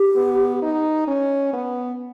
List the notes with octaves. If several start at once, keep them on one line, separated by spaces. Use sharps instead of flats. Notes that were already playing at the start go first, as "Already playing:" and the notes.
Already playing: G4
B3
D#4
C#4
B3